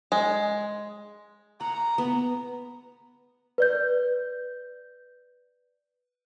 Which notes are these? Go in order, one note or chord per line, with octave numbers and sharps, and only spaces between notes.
G#3
F#5 A#5
B3
B4 D5 G6